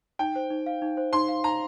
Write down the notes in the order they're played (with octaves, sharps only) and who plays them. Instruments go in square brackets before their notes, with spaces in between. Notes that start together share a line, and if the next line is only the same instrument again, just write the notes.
[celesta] D#4 [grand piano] G5
[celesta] C5
D#4
F5
D#4
C5
[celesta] D#4 [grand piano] C6
[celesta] F5
[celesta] D#4 [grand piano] A#5